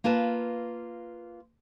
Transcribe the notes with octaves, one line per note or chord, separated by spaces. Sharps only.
A#3 F4 B4 A5